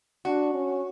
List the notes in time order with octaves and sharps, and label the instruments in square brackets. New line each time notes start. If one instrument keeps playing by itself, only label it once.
[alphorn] D4 [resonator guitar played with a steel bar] F#4
[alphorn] C#4